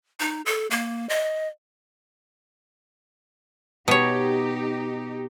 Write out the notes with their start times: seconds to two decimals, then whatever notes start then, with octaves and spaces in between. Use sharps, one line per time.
0.20 D#4
0.46 A4
0.71 A#3
1.09 D#5
3.88 B2 D#4 G4 C#5